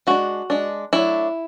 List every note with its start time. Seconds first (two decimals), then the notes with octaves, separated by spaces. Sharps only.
0.07 G#3 D4 F#4
0.50 G#3 D4
0.93 F#3 A3 D4 E4